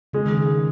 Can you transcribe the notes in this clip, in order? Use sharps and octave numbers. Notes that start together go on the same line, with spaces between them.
C#3 G#3
D#3
C#3